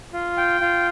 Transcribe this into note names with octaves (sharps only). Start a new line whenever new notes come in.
F4
G5
F4